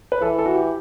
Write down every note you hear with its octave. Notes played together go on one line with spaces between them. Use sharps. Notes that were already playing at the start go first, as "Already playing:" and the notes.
B4
E3 A4
A4
F#4
G4